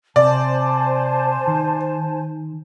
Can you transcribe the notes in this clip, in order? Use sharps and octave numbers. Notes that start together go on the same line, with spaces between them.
C3 C5 D5 G#5 A5
D#3